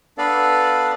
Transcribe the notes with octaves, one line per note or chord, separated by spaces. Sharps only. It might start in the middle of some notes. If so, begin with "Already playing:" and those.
B3 D4 A4 B4 D5 F5